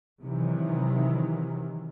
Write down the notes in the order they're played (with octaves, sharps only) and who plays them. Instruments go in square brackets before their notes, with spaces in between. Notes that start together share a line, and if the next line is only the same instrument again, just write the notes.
[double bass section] C3 D#3 E3 F#3